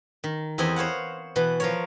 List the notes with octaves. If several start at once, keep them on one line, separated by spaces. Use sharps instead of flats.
D#3
E2 C4 E4 G4 D#5 G#5
C5 C#5 F5 F#5
B2 E3 B4
F3 A#4 C#5